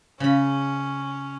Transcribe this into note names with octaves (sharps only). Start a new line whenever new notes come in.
C#3 C#4 B5